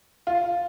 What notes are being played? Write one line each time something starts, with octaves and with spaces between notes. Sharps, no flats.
F4